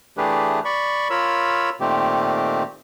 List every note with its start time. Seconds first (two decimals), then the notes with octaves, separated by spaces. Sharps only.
0.17 E3 A3 D4 G4 G#4 B4
0.65 D5 B5 C#6
1.10 F4 A#4 C#5 B5 E6
1.80 A#2 D#3 A3 C4 G4